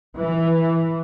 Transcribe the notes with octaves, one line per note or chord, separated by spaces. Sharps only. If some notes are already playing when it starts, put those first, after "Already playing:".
E3